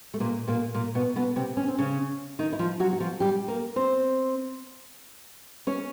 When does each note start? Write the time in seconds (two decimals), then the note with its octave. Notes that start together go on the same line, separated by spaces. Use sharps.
0.14 A3
0.20 A#2 A#3
0.48 A#2 A#3
0.75 A#2 A#3
0.95 B2 B3
1.16 B2 B3
1.36 C3 C4
1.57 C#4
1.68 C4
1.78 C#3 C#4
2.39 D#3 D#4
2.52 E4
2.59 F3 F4
2.80 F#3 F#4
2.93 F#4
3.00 F3 F4
3.20 G3 G4
3.48 A#3 A#4
3.76 C4 C5
5.67 C#4 C#5